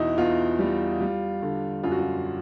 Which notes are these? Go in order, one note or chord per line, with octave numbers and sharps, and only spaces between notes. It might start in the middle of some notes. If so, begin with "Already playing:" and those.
Already playing: E2 B2 D#4 E4 F#4
E2 F4
G3
G3
D3
F#2 F4
F#4
F4